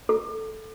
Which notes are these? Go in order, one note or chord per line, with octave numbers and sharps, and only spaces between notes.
A4